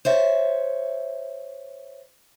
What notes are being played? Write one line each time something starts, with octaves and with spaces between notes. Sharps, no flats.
C5 C#5 E5